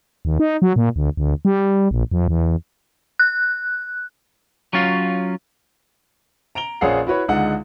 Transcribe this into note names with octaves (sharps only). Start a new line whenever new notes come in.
D#2
D#4
F#3
A#2
D2
D2
G3
A#1
F2
E2
F#6
F#3 C#4 F4 F5
A#5 D7 F7 G7
A#1 C#4 G#4 F5 F#5 C7
E4 F#4 B4 C#5
C#2 D3 G#3 D#4 F#5